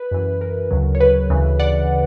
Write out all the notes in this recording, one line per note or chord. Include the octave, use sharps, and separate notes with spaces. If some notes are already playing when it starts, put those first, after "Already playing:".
Already playing: B4
F#2 E3
A#4
D2 C#3 F#3
C#5
B4
D2 C#3 E3
D5 F#5